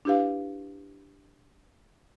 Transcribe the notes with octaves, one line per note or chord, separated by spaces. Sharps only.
D4 E4 G4 B4 F5